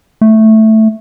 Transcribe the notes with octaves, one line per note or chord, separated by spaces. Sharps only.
A3